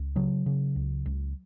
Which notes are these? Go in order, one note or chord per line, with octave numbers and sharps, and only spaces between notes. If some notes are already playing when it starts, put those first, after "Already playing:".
Already playing: C#2
C#3 F#3
C#3
C#2
C#2